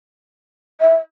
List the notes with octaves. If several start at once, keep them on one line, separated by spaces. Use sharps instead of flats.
E5